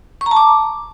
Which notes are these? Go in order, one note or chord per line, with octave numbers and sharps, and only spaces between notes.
C#6
A#5
A5
D6